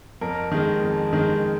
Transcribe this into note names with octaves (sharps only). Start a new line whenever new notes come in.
F2 A#4
D#3 G#3
F2
D#3 G#3